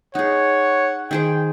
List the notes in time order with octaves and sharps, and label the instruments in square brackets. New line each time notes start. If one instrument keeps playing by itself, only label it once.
[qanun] D#4 G#4 [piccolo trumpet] C#5 [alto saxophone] F#5
[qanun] D#3 G#4 C5 [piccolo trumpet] G5